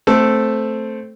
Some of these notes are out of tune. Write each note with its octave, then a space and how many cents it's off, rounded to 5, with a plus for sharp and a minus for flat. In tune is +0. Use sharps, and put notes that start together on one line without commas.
A3 +0 C4 +0 A4 +0